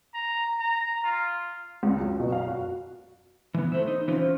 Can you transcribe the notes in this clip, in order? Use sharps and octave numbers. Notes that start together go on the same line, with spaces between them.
A#5
A#5
F4
C#2
F#3
B2
F5
F#4
E3 B3
A3 C5 E5
D#4
E3 C#4 F4 C5